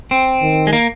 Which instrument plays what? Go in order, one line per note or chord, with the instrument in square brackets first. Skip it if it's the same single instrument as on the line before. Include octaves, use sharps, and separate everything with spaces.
[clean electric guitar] C4
[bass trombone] D#3
[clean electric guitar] G#3
A#3